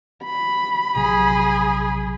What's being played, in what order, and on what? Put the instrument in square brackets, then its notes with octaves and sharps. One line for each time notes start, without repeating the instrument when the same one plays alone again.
[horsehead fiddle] B5
[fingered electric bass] A#1 C3 F#3 [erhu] G#4